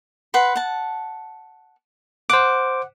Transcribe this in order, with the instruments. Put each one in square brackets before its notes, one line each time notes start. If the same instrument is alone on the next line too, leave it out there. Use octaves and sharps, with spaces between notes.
[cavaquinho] B4 F#5 C6
F#5 A5
[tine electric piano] C5 D6 [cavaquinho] F#5